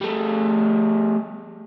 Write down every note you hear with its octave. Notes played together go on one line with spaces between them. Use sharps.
G3 A3